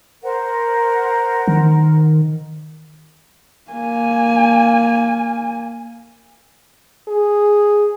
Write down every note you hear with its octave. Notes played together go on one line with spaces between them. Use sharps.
A#4 C5 F#5
D#3
A#3 G#5
G#4